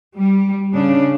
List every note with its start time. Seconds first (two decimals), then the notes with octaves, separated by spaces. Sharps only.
0.16 G3
0.74 C#3 D4